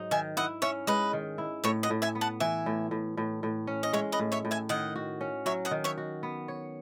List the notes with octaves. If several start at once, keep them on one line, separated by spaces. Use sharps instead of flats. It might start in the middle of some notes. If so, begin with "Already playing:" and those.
Already playing: G#2 F#3 D#4
D#3 E5 G#5
E4 D#5 F#5
C#4 C#5 E5
G#3 B4 D#5
D#3
E4
A2 C#5 E5
D#5 F#5
A2
E5 G#5
B3
F#5 A5
E3 E5 G#5
A2
A2
A2
A2
C#4
D#5
G#3 C#5 E5
B4 D#5
A2
C#5 E5
A2
E5 G#5
D#3 D#5 F#5
F#4
C#4
F#3 C#5 E5
D#5 F#5
D#3
C#5 E5
F#4
B3
C#5